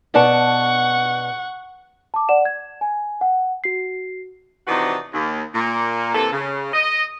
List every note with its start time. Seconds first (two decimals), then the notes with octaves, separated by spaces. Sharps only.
0.14 B2 D5 F#5 A5 C#6
2.14 A5 D6
2.29 D5 F#5 E7
2.45 G#6
2.81 G#5
3.21 F#5
3.64 F#4 C7
4.68 C3 E3 F3 D#4 F#4 D5
5.13 D#2
5.55 A#2 A#3
6.14 C3 E3 A#3 A4
6.32 C#3
6.73 D#5